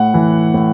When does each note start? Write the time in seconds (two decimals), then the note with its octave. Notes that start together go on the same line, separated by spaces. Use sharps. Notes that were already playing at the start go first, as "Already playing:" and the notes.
Already playing: A2 F#5
0.14 E3
0.54 A2